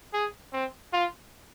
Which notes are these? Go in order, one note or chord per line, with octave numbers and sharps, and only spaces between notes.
G#4
C4
F4